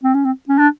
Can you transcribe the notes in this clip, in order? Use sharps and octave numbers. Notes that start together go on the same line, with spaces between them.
C4
C#4
C4
C#4
D4